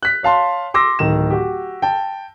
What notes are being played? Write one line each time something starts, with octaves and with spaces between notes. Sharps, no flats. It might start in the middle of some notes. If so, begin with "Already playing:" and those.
F#6 B6
C#5 F5 A5 C6
C6 D6 E6 A#6
D1 D#3 E7
F#4 G4
G5 A5